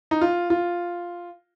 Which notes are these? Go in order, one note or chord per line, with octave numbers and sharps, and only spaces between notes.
D#4
F4
F4